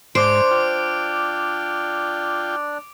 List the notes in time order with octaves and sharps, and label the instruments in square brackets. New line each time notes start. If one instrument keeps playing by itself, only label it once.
[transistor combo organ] G#2 [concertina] D4 D5 [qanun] C5 [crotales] D6 D7
[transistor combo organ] F4 G5